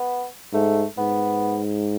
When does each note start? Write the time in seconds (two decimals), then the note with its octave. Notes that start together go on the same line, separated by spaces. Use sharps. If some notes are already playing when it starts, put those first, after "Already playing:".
Already playing: B3
0.53 G#2 A3
0.97 G#2 B3